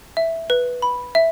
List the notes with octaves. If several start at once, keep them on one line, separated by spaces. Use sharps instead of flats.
E5
B4
B5
E5